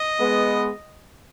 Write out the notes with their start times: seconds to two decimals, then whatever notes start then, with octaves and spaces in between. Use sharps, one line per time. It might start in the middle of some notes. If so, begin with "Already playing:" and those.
Already playing: D#5
0.19 G#3 B3